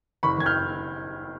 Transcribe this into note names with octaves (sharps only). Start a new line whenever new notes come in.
F#1 B5 C#6
F#1 G#6
F6 G6